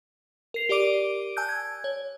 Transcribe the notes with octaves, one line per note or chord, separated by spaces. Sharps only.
A#4 C7 F7
G4 A#4 D5 D6 D7 D#7
G#5 A5 E6 F#6 G6
G#6
C#5